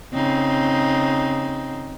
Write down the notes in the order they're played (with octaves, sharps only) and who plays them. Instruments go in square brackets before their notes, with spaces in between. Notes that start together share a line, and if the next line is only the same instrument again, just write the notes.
[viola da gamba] C#3 C4 D#4